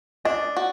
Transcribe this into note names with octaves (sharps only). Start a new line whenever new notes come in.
D4 D#5
F#4